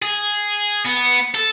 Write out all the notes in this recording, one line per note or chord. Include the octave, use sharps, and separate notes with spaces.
G#4
B3
A4